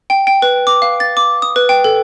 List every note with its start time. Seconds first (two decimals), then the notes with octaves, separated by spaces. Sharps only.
0.10 G5
0.27 G5
0.42 B4
0.67 D6
0.82 F5
1.00 A6
1.17 D6
1.42 D#6
1.56 B4
1.69 G5
1.84 A4